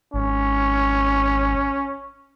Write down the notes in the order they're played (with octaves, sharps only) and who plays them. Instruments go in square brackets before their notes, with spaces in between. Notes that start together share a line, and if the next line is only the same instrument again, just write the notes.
[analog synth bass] G#1 [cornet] C#4